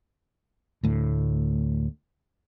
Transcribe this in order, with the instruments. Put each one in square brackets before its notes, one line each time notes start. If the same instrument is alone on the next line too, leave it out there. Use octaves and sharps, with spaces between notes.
[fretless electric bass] D2 A2